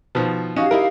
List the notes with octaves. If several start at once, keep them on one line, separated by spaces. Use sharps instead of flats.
B2 D#3 F3
C#4 D#4 F#4 G4 F5
D#4 E4 A#4